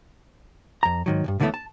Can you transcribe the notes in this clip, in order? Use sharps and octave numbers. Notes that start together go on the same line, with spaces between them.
F2 A#5
G#2 D#3 F#3
C2 G2
C#2 D3 E3 G#3 A3 B3
A5